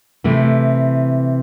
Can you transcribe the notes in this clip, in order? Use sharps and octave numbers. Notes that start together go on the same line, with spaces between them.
C3 E3 A3 E4